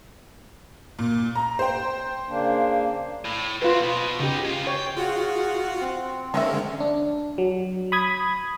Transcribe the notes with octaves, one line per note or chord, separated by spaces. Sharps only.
A#2
A#5
C5 G5
C#3 A#3 D4
A2
F#2 C4 F4 B4
B2
C#3 B3 D#4 G4
G#3 F4
C#5 G5
F4 F#4 G#4 F#5
C4
D3 D#3 G#3 A#3 C#4 E5
D4
F#3
B5 D#6 G#6